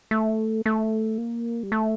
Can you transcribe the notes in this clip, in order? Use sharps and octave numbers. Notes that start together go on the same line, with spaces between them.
A3
A3
A#3
G3
A3